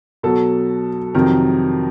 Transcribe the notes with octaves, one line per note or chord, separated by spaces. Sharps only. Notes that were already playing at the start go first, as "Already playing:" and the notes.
B2 F#3 A4
F2 C3 D#3 F#3 A#4